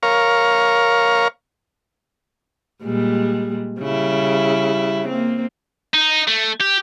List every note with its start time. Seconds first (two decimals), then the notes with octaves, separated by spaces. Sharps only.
0.03 A#4 C#5 F5
2.83 A#2 G3 G#3
3.80 C#3 G3 E4
5.08 A#3 C4
5.94 D#4
6.28 A3
6.60 G4